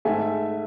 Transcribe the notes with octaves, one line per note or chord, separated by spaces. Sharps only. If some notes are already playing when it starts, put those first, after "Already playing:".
G#2 D#3 A3 E5 G#5